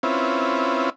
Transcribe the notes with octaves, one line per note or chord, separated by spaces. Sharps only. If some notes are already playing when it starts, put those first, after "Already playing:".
C4 C#4 E4 F4 B4